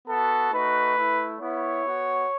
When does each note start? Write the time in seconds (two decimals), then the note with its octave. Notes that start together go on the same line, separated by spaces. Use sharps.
0.08 B3 F#4 A4
0.52 A3 D#4 F#4 B4
0.97 A3 E4
1.40 B3 E4 C#5
1.85 B3 F#4